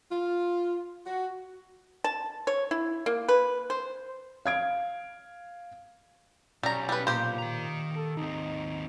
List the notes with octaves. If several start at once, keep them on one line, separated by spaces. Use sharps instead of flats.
F4
F#4
A5
C#5
E4
A#3
B4
C5
F5 G#6 D7
B1 G3 C#4 A#5
G3 B4
A#2 A#3 G4 C5
D#3 A#5
A4
D#2 C4 D#4